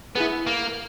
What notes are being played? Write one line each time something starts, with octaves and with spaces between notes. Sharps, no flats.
B3 E4 G#4 B4
A#3